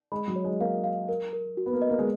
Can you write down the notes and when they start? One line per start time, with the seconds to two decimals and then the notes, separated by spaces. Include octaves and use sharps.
0.12 G#3 B5
0.28 F#3
0.36 C#5
0.44 G#3
0.60 A#3 F5
0.84 F5
1.09 A#4
1.33 A#4
1.57 F#4
1.66 B3
1.73 A#3
1.82 D#5
1.89 A#3
1.99 G#3